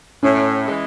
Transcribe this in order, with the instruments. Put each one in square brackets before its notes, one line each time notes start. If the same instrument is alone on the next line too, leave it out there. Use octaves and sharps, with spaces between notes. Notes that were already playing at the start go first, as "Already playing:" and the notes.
[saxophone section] A2 [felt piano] C#4
[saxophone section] E3 G#3